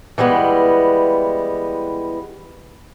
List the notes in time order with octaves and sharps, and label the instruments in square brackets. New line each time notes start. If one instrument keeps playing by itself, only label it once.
[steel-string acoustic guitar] E3 G3 G#3 B3